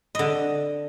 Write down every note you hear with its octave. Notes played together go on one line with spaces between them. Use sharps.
D3 D#5